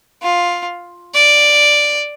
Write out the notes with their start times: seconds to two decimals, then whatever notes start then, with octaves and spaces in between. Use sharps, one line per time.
0.22 F4
1.14 D5